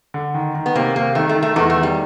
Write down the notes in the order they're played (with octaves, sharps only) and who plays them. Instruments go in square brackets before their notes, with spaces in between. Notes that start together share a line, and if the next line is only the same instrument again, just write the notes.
[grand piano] D3
D#3
D#3
[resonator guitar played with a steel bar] B3
[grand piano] C3 [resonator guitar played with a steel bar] A#3
[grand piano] C3 [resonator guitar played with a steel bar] A#3
[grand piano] D#3 [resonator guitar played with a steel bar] A3
[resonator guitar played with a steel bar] A3
[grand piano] D#3
[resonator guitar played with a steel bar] A3
[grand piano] E2 [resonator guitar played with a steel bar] A3
[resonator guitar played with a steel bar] A3
[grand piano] D#3
[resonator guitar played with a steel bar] G3